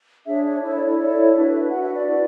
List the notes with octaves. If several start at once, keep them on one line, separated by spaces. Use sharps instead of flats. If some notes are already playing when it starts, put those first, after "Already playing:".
D4 G#4 C#5 E5
C#5
E4 A4 C#5
D5
C#5
E4 A4 C#5 D5
D4 F#4 B4 E5
D4 F#4 B4 F#5
E5
D5
E4 B4